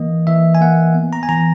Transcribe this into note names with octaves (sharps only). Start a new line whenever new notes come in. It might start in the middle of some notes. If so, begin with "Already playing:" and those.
Already playing: E3 A#3 D#5
E3 E5
G#5
A#3 F#5
B3
A#5
G#5
E3 A#5